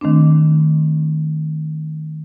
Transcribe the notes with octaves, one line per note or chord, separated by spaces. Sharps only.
D#3 A3 C4 D4